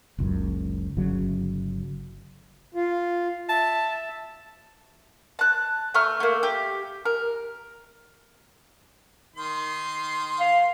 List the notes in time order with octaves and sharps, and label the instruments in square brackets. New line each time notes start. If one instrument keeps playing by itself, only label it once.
[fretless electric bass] F#1 C#2 F#2
G1 C#3 F#3
[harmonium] F4
[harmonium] E5 [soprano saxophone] A5
[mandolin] A5 F#6
A3 A#5 C#6 F6
A3 A#3
G4
A#4
[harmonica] D#3 C6
[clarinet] F5